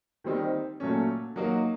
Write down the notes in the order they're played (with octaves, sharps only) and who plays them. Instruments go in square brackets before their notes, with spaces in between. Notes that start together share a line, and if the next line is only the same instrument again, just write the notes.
[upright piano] D#3 G3 C4 D#4
A#2 F#3 A3 C#4
F#3 A#3 D#4 F#4